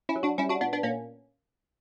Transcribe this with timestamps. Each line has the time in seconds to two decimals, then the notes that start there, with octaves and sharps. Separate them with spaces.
0.09 C#4 E4
0.16 F#3
0.23 D4 F#4
0.38 G3 C#4 E4
0.49 D4 F#4
0.61 A#2 B3 D4
0.73 B3 D4
0.83 A#2 A#3 C#4